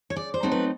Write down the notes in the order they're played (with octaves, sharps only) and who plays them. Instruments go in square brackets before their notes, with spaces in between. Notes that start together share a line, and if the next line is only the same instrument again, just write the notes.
[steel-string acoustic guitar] C#5
C#3 D5
C5
F#3 A3 C4 D#4
B4